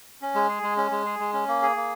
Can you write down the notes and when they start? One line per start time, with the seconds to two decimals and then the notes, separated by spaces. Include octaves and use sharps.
0.22 C#4
0.35 G#3
0.49 G#4
0.63 G#3
0.77 C#4
0.91 G#3
1.06 G#4
1.19 G#3
1.33 C#4
1.48 A#3
1.62 G#4
1.76 A#3